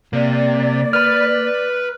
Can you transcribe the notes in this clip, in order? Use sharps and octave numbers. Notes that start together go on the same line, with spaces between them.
C3 A#3 D5
B4 B5 F6